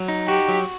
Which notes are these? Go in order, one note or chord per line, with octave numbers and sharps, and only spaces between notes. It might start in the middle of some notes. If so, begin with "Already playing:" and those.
Already playing: F#3
D#4
F#4 G4
F#3